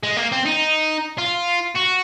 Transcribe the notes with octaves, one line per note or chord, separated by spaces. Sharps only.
G#3
A#3
C4
D#4
F4
F#4